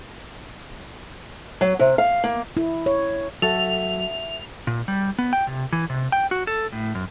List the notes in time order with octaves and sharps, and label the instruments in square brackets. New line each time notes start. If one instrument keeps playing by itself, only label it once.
[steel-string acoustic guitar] F#3
C3
F5
A#3
[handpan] E4
C#5
[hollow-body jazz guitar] F#3 [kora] F#4 A4 [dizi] E5 [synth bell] F7
[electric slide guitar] A#2
G3
B3
G5
C3
E3
C3
G5
F#4
A4
A2
F#2